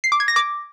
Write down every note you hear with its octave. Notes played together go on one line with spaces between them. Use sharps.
C7
D6
G#6
A#6
D6